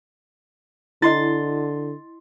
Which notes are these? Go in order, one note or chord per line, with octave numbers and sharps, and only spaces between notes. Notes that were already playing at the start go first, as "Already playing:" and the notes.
D3 E4 D#5 C6 A6